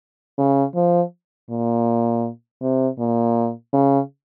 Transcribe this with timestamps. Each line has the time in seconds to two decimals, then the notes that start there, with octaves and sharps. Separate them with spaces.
0.38 C#3
0.75 F3
1.50 A#2
2.62 C3
2.99 A#2
3.73 C#3